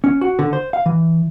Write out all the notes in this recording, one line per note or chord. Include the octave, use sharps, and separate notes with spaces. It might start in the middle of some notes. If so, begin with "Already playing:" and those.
C#4
F#4
D3
C5
F5
E3